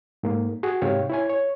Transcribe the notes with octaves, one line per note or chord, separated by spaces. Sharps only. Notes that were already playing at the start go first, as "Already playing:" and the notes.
G#2 A#3
F#4 G#4
G#2 C3 C#5 F5 G5
E4 C#5 G#5
C#5